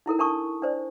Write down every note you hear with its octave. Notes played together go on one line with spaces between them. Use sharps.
D#4 E4 A4 A#4
D4 A#4 A5 C#6 D#6
D4 C5 D5